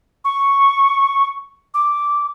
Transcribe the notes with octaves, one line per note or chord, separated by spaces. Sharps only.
C#6
D6